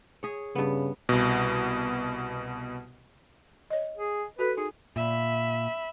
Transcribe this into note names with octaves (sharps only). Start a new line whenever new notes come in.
G#4 C#5
G2 C#3 B3
C2 B2
C#5 D#5
G#4
F#4 A4 B4
D#4 G#4
A#2 E5 B5